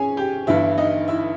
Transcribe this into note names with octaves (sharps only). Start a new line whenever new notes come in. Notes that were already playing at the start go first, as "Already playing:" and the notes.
Already playing: G#1 C#4 G#4 C#5 G#5
G4 G5
G1 G2 E3 E4 E5
D#4 D#5
E4 E5